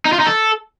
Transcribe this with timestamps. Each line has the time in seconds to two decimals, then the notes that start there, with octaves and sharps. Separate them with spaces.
0.05 D#4
0.12 F4
0.20 D#4
0.27 A4